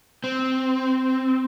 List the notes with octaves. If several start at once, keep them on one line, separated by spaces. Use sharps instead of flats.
C4